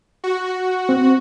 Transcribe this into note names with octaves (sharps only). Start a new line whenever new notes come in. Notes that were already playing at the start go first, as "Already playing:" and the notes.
F#4
C4